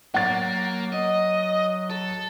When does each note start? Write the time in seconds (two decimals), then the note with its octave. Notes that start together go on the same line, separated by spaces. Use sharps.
0.14 F#3 A#3 F#5 A6
0.92 D#5
1.90 A4